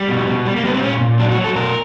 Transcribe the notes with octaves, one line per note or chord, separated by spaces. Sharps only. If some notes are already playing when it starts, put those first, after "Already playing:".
Already playing: G3
B2
B2
G3
A#3
G3 B3
C4
A#2 C#4
A#2
F#3 D4
F#4
F#3
A4
B2 A#4